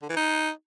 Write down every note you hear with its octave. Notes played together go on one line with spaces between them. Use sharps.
D3
E3
D#4